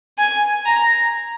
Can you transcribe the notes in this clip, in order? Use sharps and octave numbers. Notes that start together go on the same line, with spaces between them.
G#5
A#5